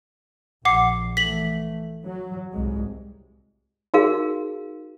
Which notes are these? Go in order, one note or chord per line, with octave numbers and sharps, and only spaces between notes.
A#1 F#5 D6 C7
E3 A3 B6 F#7
F#3
C2 G#2 G#3
D#4 F#4 G#4 A#4 F5